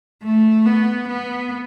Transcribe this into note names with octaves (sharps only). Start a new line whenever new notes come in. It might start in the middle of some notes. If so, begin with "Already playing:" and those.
A3
B3
B3